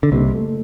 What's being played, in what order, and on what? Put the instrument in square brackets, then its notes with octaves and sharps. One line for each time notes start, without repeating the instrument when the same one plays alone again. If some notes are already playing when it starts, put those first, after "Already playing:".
[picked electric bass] D3
[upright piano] F#1 [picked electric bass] C2 C3
[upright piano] A3